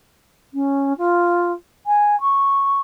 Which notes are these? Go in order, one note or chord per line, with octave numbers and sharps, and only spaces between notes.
C#4
F4
G#5
C#6